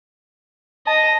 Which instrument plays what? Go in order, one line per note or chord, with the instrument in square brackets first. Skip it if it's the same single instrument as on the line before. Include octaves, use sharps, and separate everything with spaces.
[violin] D#5 [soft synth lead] A5